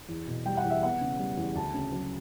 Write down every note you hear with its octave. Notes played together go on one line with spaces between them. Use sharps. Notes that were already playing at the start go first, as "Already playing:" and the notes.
E2
B2
G3 G5
F#5
E2
E5
B3 F#5
C#3
G3
E2
D2 A5
C#3
F#3